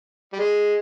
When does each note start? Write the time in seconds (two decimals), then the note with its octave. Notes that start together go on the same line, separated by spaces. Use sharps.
0.33 G3
0.39 G#3